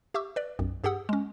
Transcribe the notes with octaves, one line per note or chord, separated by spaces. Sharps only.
G4 E5 C#6 D6 E6
B4 D5
B1 F#2
G2 G4 G#4 F#5 D#6 E6
G#3 C#4